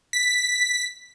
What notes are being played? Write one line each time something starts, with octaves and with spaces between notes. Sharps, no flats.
B6